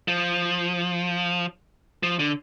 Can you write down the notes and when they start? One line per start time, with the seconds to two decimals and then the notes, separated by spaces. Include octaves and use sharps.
0.08 F3
2.03 F3
2.19 D3